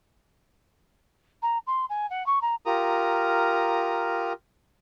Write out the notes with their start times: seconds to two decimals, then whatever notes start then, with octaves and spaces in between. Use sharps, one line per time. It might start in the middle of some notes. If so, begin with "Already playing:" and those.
1.42 A#5
1.66 C6
1.89 G#5
2.10 F#5
2.26 C#6
2.41 A#5
2.65 F4 G4 A#4 A#5 D#6